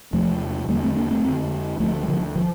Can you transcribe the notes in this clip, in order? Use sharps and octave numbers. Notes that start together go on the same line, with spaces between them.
E2 C3 F3 A3
E2 D3 G3 A#3
A3 C4
A#3 D4
A3 C4
F2 D3
D2 D3 F3 A3
G3
D3 F3
D3 F3